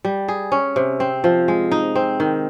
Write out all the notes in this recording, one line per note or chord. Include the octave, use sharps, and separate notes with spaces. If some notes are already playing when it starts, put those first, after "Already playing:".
G3
G#4
C#4
C3
C4
F3
G#3
D#4
C4
D#3